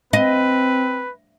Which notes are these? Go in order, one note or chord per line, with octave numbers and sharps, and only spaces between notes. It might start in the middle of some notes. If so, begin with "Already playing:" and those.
C4 B4 D#5